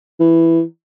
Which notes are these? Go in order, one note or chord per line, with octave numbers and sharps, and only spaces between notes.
E3